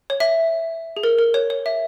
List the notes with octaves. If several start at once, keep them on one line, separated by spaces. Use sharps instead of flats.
C#5
E5
G#4
A#4
A#4
C#5
C#5
E5